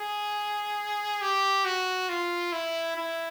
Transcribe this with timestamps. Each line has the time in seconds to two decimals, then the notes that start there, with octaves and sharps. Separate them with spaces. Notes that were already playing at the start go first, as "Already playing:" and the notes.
Already playing: G#4
1.22 G4
1.65 F#4
2.09 F4
2.53 E4
2.96 E4